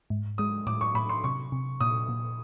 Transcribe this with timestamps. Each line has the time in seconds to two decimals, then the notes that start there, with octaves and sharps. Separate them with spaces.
0.10 G#2
0.38 G#3 D#6
0.67 A2 D6
0.81 C#6
0.95 A2 B5
1.09 C6
1.24 C3 C#6
1.52 C3
1.81 A#2 D#6
2.09 A#2